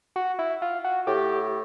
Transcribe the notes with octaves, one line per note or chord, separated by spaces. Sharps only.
F#4
E4
F4
F#4
A2 G4